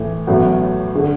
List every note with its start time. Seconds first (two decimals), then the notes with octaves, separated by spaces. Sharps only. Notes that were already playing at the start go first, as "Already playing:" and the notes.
Already playing: A2 E3 A3
0.27 A1 A2 F#3 B3 F#4
0.95 D3